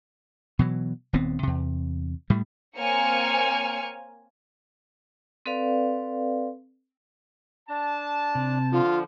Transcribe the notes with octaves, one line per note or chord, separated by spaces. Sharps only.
B2 E3 F#3
D#1 D#2 B3 C4
E2 C3
A2 G3 A3
A#3 C4 C#5 G#5 F6 C#7
C4 A4 B4 D5 F5
D4 A5
C3
D3 F3 F4